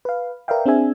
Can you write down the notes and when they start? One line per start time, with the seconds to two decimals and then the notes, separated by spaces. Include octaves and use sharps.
0.05 B4 F5
0.48 A#4 B4 D5 E5 F5 G5
0.66 C4 D4 G#4 E5 G#5